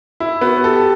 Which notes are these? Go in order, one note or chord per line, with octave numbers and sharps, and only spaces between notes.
E4
B3 F#4
G4 A4